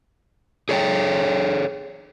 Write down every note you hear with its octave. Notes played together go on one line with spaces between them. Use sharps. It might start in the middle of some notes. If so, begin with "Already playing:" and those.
G#4 A4 C#5 E5 G5